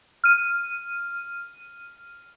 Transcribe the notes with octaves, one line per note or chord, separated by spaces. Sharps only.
F6 D#7